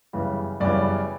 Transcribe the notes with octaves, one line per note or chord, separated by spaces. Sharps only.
F#2 C#3 E3 G3 B3
F#2 C#3 E3 G3 B3 D5